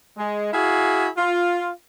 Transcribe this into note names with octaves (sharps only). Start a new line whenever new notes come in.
G#3
E4 F#4 G#4 F5 G#5
F4